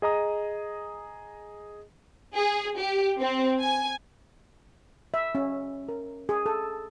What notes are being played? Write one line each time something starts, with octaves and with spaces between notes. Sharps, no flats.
G#4 D#5 A#5 D#6
G#4
G4
C4
G#5
E5
C#4
A#4
G#4
A4